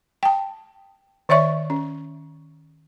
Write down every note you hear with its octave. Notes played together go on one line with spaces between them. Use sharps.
G5 A5
D#3 C#5 D5 E5 C#6
C#4